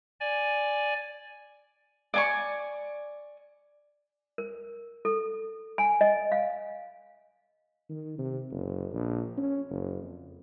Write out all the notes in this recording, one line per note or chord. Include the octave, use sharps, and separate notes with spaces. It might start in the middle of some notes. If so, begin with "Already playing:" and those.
D5 G#5
D5 G#5 C#6
A#4
A4
G#5
D#5
F5
D#3
C3
F#1
A#1
C#4
F#1
F2